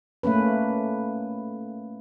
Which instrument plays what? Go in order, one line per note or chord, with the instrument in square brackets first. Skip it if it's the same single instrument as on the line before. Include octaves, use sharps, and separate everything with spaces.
[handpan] A3 A#3 C#4 B4